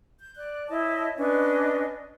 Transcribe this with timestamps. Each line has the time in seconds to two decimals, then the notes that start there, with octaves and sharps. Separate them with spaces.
0.19 G6
0.36 D5 F#6
0.68 E4 C#5 D#5 A5
1.18 C#4 D4 B4 D#5